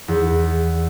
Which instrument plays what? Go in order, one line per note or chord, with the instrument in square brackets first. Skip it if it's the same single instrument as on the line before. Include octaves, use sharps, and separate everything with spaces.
[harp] E2